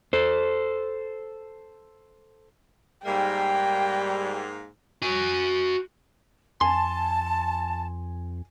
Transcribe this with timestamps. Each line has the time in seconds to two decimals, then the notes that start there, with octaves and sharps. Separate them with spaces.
0.13 A4 C5
3.06 G#2 G3 A#3 G5
5.02 F#4 G#5
6.61 F2 G#5 A5 C6